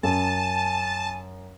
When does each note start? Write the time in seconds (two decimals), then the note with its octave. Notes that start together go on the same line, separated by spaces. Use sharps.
0.03 F#2 G#5 A5